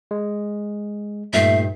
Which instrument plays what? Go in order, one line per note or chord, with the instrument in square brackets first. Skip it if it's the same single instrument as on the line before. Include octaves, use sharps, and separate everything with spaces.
[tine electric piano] G#3
[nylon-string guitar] G2 D#4 [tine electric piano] A#2 A3 C7 [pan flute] E5